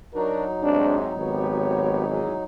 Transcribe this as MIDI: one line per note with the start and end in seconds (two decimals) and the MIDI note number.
0.14 2.44 54
0.14 0.46 62
0.14 2.44 63
0.14 0.46 66
0.14 0.46 70
0.63 1.12 44
0.63 1.12 48
0.63 0.97 62
1.17 2.32 32
1.17 2.05 59
1.17 2.05 67
1.17 2.05 73
2.09 2.33 40
2.09 2.33 52
2.09 2.33 56